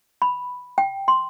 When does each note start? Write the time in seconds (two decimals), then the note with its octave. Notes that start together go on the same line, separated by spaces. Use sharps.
0.22 B5
0.78 G5
1.08 C6